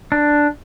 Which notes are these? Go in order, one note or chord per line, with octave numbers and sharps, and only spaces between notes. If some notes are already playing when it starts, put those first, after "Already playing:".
D4